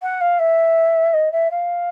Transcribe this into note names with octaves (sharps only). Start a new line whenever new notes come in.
F#5
F5
E5
D#5
E5
F5